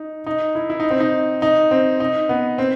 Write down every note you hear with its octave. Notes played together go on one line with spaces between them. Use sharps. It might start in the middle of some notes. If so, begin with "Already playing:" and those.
Already playing: D#4
D#4
E4
E4
D#4
C4
D#4
D#4
C4
D#4
B3
C4